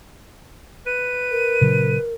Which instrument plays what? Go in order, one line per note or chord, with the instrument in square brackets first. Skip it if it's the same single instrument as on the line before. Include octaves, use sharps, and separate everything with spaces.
[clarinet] B4 [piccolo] D#7
[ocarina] A#4
[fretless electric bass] A#2 C#3 F#3